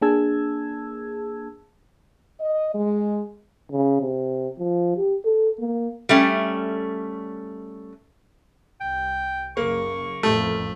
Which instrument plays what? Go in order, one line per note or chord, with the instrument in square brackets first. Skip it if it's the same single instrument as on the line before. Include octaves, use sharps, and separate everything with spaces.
[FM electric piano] A#3 D4 G#4 A5 E6 G#6
[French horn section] D#5
G#3
[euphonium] C#3
C3
F3
G4
A4
A#3
[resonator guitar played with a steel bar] G3 A3 C#4
[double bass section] C2 [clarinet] G5
[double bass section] F#1 C#3 [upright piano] A#3 [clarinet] C#6
[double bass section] A1 F2 A2 [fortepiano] A3